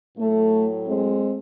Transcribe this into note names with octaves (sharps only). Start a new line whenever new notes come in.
A2 F#3 A3
G#3 C4